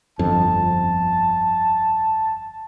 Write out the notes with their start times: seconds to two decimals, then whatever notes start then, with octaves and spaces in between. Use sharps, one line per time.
0.19 G1 F2 A5